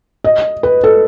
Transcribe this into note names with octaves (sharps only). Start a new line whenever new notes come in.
D#5
B4
A4